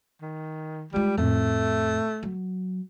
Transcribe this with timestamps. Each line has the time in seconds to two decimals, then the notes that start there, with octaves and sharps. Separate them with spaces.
0.22 D#3
0.93 G3 G#3 F4
1.17 F2 A2 A3
2.23 F#3